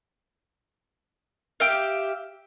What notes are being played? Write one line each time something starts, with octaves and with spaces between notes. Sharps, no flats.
G4 E5 F5